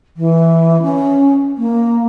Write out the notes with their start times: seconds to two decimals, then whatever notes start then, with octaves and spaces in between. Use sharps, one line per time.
0.17 E3
0.82 C#4
1.58 A#3